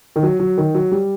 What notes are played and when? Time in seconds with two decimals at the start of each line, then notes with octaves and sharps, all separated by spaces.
0.16 D#3
0.23 F#3
0.40 F#3
0.58 D#3
0.75 F#3
0.91 G3